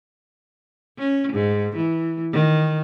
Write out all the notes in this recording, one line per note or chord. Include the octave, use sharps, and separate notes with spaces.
C#4
G#2
E3
D#3